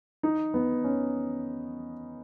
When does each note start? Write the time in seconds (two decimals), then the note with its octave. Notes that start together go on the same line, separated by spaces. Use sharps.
0.23 D#4
0.54 B3
0.84 C#4